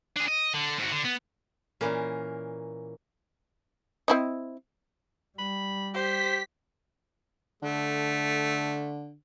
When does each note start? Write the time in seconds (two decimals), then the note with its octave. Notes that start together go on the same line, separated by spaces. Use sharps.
0.16 D4 G#4
0.28 D#5
0.53 D3
0.78 G#2 F#4
0.91 D3
1.04 B3
1.81 A#2 E3 A#3 C#4 A#4
4.08 C4 E4 D#5
5.38 G3 B5
5.94 G4 C5 B6
7.62 D3 A3